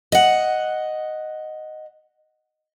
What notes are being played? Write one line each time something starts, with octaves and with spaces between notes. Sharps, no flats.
D#5 F#5